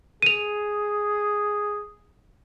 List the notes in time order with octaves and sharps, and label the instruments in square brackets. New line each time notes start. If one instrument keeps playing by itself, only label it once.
[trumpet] G#4 [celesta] D#7 F7